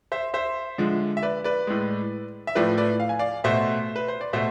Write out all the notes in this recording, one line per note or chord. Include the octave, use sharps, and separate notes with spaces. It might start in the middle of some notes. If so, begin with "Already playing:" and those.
C5 E5
C5 E5
D3 F3 G#3
E5
B4 D5
B4 D5
A2 G#3
E5
A2 F3 A3 B4 D5
B4 D5
F5
G#5
D5 F5
B2 A3 C5 E5
B4
C5
D5
B2 A3 C5 E5